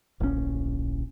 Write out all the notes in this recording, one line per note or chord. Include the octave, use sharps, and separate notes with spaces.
D1 A#1 B2 C#4